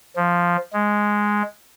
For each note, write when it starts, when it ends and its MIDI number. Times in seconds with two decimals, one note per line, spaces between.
0.16 0.57 53
0.73 1.43 56